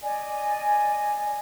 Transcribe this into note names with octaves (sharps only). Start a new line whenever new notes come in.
D5 D#5 G#5